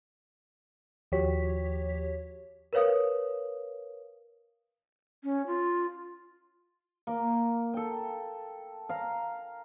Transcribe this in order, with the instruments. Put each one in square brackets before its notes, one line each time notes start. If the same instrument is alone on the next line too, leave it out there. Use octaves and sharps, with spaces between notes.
[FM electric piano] D#2 F3 F#4 G4 C#5 B6
[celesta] A#4 B4 C#5 F5 D#6
[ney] C#4
F4
[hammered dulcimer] A#3 D6
A4 G5
F5 A#5